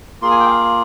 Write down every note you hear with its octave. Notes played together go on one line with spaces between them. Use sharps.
A#3 F4 G#4 C6
G#5
G5
F5